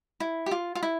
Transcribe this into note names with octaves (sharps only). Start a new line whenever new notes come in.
E4
G4
F4
F4
E4